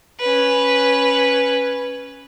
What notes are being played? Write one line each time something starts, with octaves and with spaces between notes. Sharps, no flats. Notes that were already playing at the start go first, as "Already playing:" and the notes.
C#4 B4